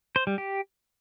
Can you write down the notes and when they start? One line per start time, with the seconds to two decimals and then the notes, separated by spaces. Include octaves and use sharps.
0.16 C5
0.27 G3
0.38 G4